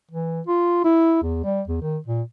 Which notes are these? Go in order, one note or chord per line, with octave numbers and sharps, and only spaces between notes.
E3
F4
E4
E2
G3
E2
D#3
A#2